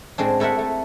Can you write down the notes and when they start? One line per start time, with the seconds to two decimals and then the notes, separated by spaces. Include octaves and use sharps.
0.18 A2 G#3 C4 D4
0.40 A3 E4 A#4 E5 F#5
0.59 A3